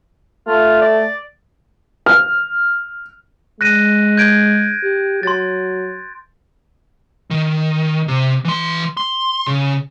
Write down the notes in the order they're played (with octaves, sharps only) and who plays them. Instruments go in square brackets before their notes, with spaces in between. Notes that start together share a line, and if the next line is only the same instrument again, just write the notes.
[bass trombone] A3 [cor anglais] F4
[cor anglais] D5
[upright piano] F6
[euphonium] G#3 [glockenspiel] F#6 A#6 D#7
[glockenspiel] G6 G#6 D7
[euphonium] G4
[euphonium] F#3 [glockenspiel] C6 A6
[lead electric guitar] D#3
C3
E3 C6
C6
C#3